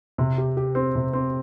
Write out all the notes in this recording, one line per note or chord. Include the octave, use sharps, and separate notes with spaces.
C3
G4
G4
C4
C3
C4